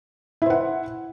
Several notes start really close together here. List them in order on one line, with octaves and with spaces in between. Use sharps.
E4 C5 F#5